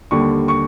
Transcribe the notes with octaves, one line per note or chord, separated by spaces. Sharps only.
D#2 D3 G3 C#6
C#6